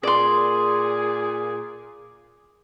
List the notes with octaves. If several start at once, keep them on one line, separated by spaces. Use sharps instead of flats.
A#2 G#4 D5 C6